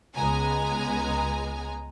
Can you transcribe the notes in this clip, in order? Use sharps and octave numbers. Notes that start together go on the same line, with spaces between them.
C#2 G#3 B3 G#5 A#5